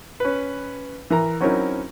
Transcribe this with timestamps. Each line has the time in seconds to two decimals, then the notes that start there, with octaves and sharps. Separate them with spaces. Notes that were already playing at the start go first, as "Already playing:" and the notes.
0.20 C#4 B4
1.10 E3 A#4 A#5
1.40 F#3 C4 C#4 D#4 E4 A#4